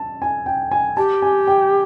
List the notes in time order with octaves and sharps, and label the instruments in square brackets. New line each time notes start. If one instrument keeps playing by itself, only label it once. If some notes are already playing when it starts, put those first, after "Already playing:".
Already playing: [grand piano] A5
G#5
G5
G#5
[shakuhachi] G4 [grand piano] A5
[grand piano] G#5
G5